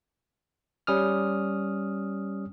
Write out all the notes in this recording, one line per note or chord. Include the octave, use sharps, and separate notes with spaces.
G3 C#4 D#6 F6